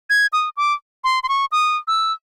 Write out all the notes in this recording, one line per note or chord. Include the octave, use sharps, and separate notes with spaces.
G#6
D#6
D6
C6
C6
C#6
D#6
E6